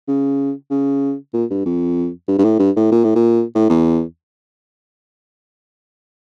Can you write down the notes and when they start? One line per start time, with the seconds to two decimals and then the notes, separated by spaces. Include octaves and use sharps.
0.08 C#3
0.71 C#3
1.34 A#2
1.50 G2
1.66 F2
2.28 G2
2.39 G2
2.44 A2
2.60 G2
2.76 A2
2.92 A#2
3.04 A2
3.16 A#2
3.55 A2
3.70 E2